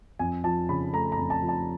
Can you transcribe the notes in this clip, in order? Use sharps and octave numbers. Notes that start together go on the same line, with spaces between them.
F2 G#5
F3 A5
C#3 B5
A3 A#5
A#5
F2
A5
F3
A5